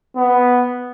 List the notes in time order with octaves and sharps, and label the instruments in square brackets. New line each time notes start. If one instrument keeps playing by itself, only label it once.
[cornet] B3